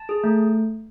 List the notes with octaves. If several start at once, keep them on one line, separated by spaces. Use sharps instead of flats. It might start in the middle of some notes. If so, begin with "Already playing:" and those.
Already playing: A5
G#4
A3